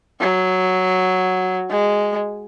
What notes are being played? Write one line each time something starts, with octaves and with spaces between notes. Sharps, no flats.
F#3
G#3